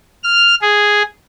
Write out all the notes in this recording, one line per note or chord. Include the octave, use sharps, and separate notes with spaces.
F6
G#4